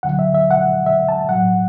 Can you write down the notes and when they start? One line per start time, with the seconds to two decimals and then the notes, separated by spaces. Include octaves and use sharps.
0.03 D2 D3 F#3 F#5
0.19 E5
0.34 E5
0.51 F#5
0.86 E5
1.09 A5
1.29 A2 F#3 F#5